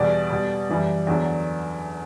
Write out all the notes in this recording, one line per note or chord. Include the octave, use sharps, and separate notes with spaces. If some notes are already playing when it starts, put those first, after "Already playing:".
Already playing: E2 B2 G3 D5
B2 G3
F#2 E3 G3
E2 D3 F#3